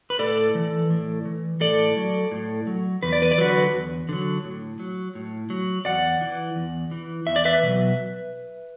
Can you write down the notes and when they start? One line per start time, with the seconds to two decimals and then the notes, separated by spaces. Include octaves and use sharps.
0.10 B4
0.19 A2 A4 D5
0.55 E3
0.90 A2
1.25 E3
1.60 A2 A4 D5
1.96 F#3
2.31 A2
2.67 F#3
3.03 E2 B4
3.13 D5
3.22 B4
3.31 D5
3.38 D3 F#3 F#4 B4
3.73 E2
4.09 D3 F#3
4.44 A2
4.80 F#3
5.15 A2
5.50 F#3
5.85 E2 D5 F#5
6.21 E3
6.56 E2
6.91 E3
7.27 E2 E5
7.36 D5
7.45 B4 E5
7.63 B2 F#3